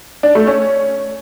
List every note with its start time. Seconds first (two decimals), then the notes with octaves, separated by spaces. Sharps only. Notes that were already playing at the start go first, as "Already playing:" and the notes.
0.23 D4
0.35 A3
0.47 C#4